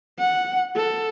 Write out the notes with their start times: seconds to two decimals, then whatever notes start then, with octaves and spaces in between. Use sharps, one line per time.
0.19 F#5
0.76 A4